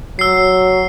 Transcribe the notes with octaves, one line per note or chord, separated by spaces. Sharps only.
F#3 E6 C7